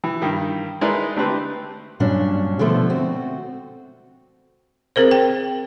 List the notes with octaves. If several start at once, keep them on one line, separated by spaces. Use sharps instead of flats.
E3
G2 D#3
G#3 D#4 E4 A#4 B4 D5
D3 A3 C4 G4 B4 C5
G2 A#2 F#3 C#4 D4
B2 D3 F3 A3
C4 F#4
C4 G#4 A#4 C5
G5